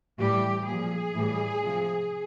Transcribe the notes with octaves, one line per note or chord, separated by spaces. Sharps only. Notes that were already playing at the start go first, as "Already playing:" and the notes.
A2 E3 G3 G4
A#2 F3 G#4
A2 E3 G3
C3 F3